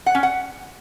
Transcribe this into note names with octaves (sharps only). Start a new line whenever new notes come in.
F#5
C#4
F#5